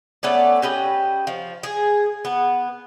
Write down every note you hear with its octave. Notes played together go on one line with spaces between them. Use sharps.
A3 B3 C#4 D5
C#4 G4 B4 D#5
F3
G#4
B3